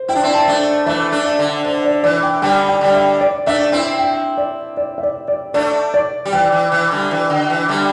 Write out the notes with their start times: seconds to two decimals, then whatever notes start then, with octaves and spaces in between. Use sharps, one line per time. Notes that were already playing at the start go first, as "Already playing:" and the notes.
Already playing: C5
0.08 E4 G5
0.15 D4
0.23 C4 E4
0.34 A5
0.48 A3 D4
0.86 E3 A3 E5
1.12 A3 D4
1.25 E5
1.39 D3
1.64 D3 C5
1.84 D5
2.04 E3 D5
2.23 G5
2.42 D3 G3 G5
2.69 G5
2.81 D3 G3
2.95 E5
3.21 D5
3.46 A3 D4 E5
3.72 C4 E4 E5
3.99 G5
4.37 D5
4.77 D5
4.98 E5
5.03 D5
5.28 D5
5.54 A3 D4 D5
5.94 D5
6.25 G3
6.32 E3 G5
6.52 E3
6.72 E3
6.91 D3 G3
7.11 E3
7.30 D3
7.50 E3
7.69 D3 G3